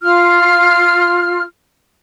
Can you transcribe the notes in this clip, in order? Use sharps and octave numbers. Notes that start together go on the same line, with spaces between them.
F4 F6